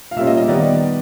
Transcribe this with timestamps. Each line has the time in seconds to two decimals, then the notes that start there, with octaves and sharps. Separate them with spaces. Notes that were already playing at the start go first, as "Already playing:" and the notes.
0.11 F5
0.16 A#2 G3 A#3 C#4 E5
0.27 D#5
0.37 D#5
0.48 D#3 G3 B3 D5